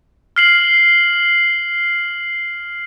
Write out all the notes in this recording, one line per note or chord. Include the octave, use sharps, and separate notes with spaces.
F6 C7 F#7